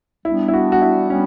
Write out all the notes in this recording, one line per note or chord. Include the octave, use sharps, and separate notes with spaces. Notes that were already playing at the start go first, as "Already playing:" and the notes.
G3 B3 D4 E4
E4
F#4
F#4
E4
G3 B3 C#4 D4